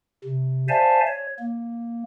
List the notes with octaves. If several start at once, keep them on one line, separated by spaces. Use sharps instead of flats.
C3
C5 D5 E5 F5 G#5 A5
C#5
A#3